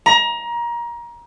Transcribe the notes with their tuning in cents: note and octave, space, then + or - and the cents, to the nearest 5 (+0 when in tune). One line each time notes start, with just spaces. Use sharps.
A#5 +25